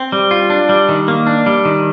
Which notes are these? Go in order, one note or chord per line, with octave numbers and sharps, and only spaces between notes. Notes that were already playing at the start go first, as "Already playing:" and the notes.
Already playing: C4
G3
F4
D4
G3
D#3
A#3
D4
G3
D#3